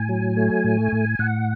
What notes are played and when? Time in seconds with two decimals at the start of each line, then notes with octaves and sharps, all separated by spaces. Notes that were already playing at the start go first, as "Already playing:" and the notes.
Already playing: A2 G#5
0.09 F#3
0.37 A3
0.64 A2
0.92 A2
1.19 A2 F#5